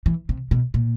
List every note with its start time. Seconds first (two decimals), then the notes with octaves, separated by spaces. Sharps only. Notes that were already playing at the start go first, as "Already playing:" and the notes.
0.06 E3
0.29 C3
0.51 B2
0.74 A#2